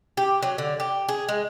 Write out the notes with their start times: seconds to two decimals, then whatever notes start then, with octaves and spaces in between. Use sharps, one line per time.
0.17 G4
0.43 F#3
0.58 D3
0.80 G4
1.09 G#4
1.29 G#3